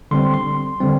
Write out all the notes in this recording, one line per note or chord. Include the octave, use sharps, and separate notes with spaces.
D3 G3 C4 C6
C6
D3 G3 C4